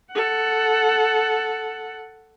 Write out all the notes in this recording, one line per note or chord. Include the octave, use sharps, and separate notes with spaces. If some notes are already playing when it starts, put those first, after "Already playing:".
A4 F#5